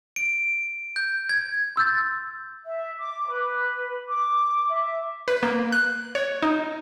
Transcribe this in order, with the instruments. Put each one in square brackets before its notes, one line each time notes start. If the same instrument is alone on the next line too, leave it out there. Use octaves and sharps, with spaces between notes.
[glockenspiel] D7
G6
G#6
[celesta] C6 E6 G6 A6
[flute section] E5
D6
B4
D6
E5
[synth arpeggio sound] B4
A#3
F#6
C#5
D#4